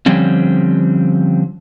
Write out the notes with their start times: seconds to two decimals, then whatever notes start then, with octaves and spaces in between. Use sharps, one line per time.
0.06 D3 F3 G3 C4 C#4